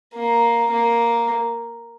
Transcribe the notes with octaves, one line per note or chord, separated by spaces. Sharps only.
A#3
A#3